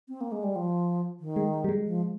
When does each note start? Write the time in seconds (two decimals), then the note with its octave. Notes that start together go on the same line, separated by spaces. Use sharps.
0.08 C4
0.21 A#3
0.32 G#3
0.43 G3
0.56 F3
1.20 D#3
1.36 G#3
1.64 G3
1.69 G#3
1.86 F3